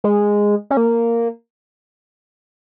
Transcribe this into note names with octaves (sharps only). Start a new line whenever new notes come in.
G#3
C#4
A#3